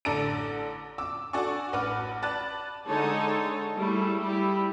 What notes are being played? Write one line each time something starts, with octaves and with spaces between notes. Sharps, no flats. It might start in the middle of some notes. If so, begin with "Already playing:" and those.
A1 D3 A4 D5 A#5 D7
D6 E6
D4 F#4 A4 D5 G#5 C#6
A1 B4 F#5 D6 F6
D5 A5 B5 F#6 A6
D3 G#3 D#4 C#5 A5
G3 A3 E4 G#4
G3 E4 G4